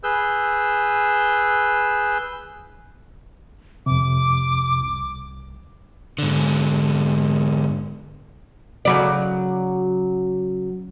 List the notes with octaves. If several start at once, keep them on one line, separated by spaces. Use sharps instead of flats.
G#4 B4 E6 G6
F2 C3 D6
C2
G#2 D3
C#3 F#3 D5